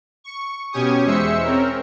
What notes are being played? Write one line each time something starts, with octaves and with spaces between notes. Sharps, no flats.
C#6
B2 C#4 G4 G#5 C#6 D#6
E2 G#3 C5 E5 E6 C#7
C4 C#4 A#4